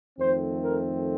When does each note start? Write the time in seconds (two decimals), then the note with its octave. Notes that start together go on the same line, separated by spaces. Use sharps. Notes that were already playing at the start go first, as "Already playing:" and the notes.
0.18 F2 D#3 A3 C4 C5
0.63 A#4